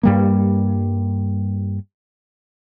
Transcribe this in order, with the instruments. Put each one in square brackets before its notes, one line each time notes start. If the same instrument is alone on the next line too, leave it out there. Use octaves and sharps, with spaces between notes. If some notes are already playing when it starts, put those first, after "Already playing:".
[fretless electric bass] G2 G3 A#3